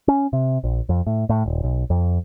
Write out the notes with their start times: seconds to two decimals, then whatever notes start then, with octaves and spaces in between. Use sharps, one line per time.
0.08 C#4
0.33 C3
0.64 A#1
0.89 F2
1.07 A2
1.29 A2
1.46 D#1
1.64 B1
1.90 F2